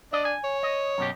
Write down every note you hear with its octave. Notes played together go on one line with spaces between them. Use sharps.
D4 D5 D#5
G#5
C#5
D#5
F#2 B2 G4